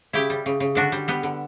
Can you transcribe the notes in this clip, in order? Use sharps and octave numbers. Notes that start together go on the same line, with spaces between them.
C#3 E4 G4
G3
C#3
C#3
D3 D4 F#4
G3
G3 B3
D3